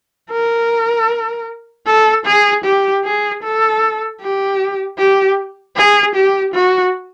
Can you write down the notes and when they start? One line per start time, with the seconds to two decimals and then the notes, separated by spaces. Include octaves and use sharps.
0.31 A#4
1.87 A4
2.26 G#4
2.65 G4
3.05 G#4
3.43 A4
4.21 G4
4.99 G4
5.76 G#4
6.15 G4
6.54 F#4